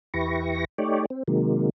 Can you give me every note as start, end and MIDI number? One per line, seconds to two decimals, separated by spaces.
0.14 0.65 40
0.14 0.65 64
0.14 0.65 67
0.14 0.65 71
0.14 0.65 85
0.14 0.65 94
0.78 1.06 57
0.78 1.06 63
0.78 1.06 67
0.78 1.06 73
0.78 1.06 74
1.10 1.23 60
1.28 1.70 48
1.28 1.70 51
1.28 1.70 54
1.28 1.70 56
1.28 1.70 58